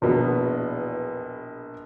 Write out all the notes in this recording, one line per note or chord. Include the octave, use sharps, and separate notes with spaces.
A#1 E2 B2 B3